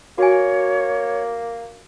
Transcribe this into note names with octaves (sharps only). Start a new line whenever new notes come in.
A#3 F#4 C#5 G#5